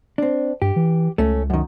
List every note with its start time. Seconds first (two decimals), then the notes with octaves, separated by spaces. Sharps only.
0.18 C4 D4
0.62 G2 G4
0.76 E3
1.18 C#2 A3 C#4
1.50 F#2 D#3